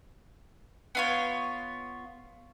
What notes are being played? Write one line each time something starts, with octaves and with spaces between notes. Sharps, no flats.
B3 F4 C#5